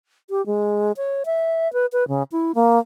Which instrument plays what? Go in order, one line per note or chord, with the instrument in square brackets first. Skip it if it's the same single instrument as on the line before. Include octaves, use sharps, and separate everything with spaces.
[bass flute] G4
G#3
C#5
E5
B4
B4
C#3
E4
A#3